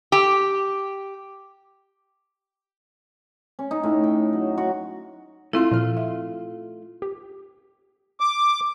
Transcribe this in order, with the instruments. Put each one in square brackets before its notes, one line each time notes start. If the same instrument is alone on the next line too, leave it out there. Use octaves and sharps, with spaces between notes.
[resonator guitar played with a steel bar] G4
[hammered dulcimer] C#4
D#4
A2
G5
F#3
F#4
[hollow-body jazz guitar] A3 F4 [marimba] C4 E4
[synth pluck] A#2 F3 F6
[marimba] E5
[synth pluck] G4
[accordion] D6